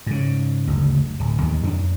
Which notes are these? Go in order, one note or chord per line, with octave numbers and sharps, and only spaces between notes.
G#2 C#3
F#1 D2
D1
D#2 D#3
F2 C#4 D4